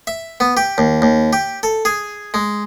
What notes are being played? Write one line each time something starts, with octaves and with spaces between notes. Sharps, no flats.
E5
B3
G4
D#2
D#2
G4
A4
G#4
G#3